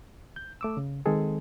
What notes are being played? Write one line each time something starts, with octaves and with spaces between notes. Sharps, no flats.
G6
A3 D6 E6
C#3
D#3 G#3 C4 G#4 A4